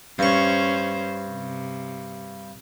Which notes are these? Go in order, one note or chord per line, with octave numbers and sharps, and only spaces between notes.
G2 C#4 C5 C#6
C3